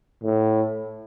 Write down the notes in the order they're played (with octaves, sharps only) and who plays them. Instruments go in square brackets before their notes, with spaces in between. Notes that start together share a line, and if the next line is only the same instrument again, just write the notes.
[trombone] A2